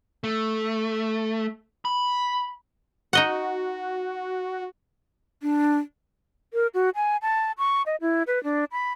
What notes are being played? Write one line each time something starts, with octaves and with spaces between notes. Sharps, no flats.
A3
B5
D#4 F#4 D#5 F#5
D4
A#4
F#4
G#5
A5
C#6
D#5
E4
B4
D4
B5